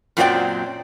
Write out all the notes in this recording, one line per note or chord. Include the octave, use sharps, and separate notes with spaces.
F#2 A#2 F#3 C4 D5 G5